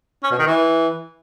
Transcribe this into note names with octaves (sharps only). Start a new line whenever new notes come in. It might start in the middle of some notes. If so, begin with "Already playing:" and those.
C#4
B2
D#3
E3